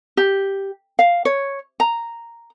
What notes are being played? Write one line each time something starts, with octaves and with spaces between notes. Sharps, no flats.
G4
F5
C#5
A#5